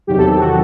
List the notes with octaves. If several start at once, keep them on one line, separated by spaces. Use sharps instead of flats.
E2 C3 D#3 F#3 G4
A4
A4
F#4